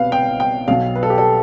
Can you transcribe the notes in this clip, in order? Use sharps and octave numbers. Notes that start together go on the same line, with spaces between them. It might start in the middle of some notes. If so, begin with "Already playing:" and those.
Already playing: C2 B2 B4 F5
G5
G5
B1 B2 F5
B4
A4
G4
A4